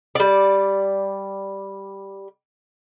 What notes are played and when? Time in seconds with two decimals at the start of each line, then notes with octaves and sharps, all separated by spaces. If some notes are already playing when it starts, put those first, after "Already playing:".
0.15 G3 D5